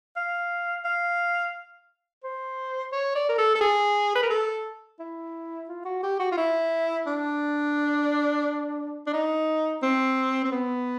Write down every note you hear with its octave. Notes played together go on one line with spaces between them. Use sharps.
F5
F5
C5
C#5
D5
A#4
A4
A4
G#4
B4
A#4
A4
E4
F4
F#4
G4
F#4
F4
E4
D4
D4
D#4
C4
C4
B3